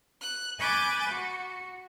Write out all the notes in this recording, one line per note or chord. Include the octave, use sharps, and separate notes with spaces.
F#6
G#5 B5 D6 F#6 G6 A6
F#4